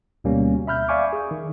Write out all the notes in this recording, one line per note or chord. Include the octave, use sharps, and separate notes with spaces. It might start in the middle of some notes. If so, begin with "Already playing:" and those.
D2 B2 G3 A#3 C#4
E5 B5 F6 G6
D5 E5 F5 G#5 C#6 D6
G#4
D#3